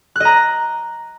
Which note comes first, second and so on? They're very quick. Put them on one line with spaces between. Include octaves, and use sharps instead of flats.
F#6 D#5 A#5